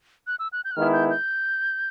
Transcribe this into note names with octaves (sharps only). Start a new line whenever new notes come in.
F#6
E6
F#6
G6
F#6
D#3 G#3 B3 E4 F6
G6
G6